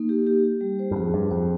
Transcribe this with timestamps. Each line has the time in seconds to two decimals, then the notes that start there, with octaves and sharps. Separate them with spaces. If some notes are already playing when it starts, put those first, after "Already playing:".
Already playing: A#3 D#4
0.09 G4
0.27 G4
0.44 G4
0.61 G3
0.79 C5
0.91 G2
0.96 F2 G#4
1.13 G2 G#4
1.31 F2 C5